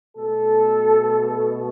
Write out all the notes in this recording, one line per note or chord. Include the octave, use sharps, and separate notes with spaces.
B2 A3 A4